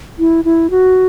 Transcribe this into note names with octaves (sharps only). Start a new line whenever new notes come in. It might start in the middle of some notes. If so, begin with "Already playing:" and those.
E4
E4
F#4